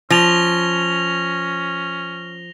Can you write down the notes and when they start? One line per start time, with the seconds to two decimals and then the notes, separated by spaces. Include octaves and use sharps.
0.11 F3 C#4 A#6 F7 G7